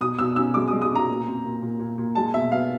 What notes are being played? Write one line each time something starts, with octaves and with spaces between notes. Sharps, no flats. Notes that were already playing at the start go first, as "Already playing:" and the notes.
B2 D#6
B2 E6
C#4 E6
G#3 D6
D#6
G#3
D#6
C#4
A#5
A#2
C4
A#2
A#2
A#2
A#2
G#3 A5
B2 E5
B3 F5